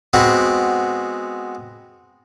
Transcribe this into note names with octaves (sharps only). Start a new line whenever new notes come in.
G#3 B3 C4 F#4